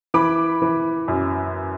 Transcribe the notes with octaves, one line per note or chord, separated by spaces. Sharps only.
E3 B5 D6
E3
F#2